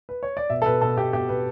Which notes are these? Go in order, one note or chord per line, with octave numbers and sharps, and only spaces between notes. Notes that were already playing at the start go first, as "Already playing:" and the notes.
B4
C#5
D5
B2 E5
A4
B2 B4
B2 A4
B2 G4
B2 G4
B2 B4